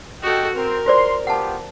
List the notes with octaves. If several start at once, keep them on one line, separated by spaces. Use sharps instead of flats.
F#4 G4 A4 D#5 G5
C4 A#4
F4 C5 D5 C6
B3 F4 G4 F#5 A5